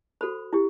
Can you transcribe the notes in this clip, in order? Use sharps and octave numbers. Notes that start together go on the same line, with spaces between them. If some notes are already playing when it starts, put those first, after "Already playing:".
F#4 A4 C5 B5
E4 G4